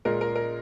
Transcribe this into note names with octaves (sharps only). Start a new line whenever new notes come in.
A#2 G#3 A#4
A#4
A#4